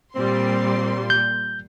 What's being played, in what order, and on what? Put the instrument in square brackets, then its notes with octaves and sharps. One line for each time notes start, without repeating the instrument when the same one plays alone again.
[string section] A#2 G3 C6 [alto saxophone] C4
[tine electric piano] G6